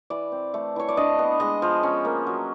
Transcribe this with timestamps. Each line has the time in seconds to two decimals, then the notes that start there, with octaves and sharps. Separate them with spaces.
0.10 E3 D5
0.32 C4
0.54 A3
0.76 E3 C#5
0.89 D5
0.97 D4 D#5
1.19 B3
1.40 G#3 D#5
1.62 F3
1.83 C#4
2.05 A#3
2.27 F#3